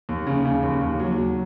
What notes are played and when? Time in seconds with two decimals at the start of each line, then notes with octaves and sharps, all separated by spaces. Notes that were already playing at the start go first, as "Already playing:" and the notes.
0.09 D#2
0.27 C#3
0.45 C#3
0.63 D#2
0.81 D#2
1.00 F#3
1.18 F#3